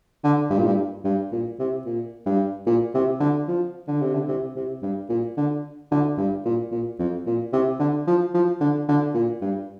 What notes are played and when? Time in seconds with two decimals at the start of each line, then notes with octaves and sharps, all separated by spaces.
0.24 D3
0.50 G2
0.58 A#2
0.67 G2
1.04 G2
1.32 A#2
1.59 C3
1.86 A#2
2.26 G2
2.67 A#2
2.94 C3
3.20 D3
3.48 F3
3.88 D3
4.02 C3
4.14 D3
4.28 C3
4.55 C3
4.82 G2
5.09 A#2
5.37 D3
5.91 D3
6.18 G2
6.45 A#2
6.71 A#2
6.99 F2
7.26 A#2
7.53 C3
7.79 D3
8.07 F3
8.34 F3
8.61 D3
8.88 D3
9.14 A#2
9.41 G2